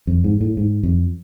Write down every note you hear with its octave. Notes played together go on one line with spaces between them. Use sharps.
F2
G#2
A2
G#2
F2